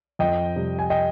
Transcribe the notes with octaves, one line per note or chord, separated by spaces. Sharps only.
F2 D#5 G5
C3 G3
G#5
D#5 G5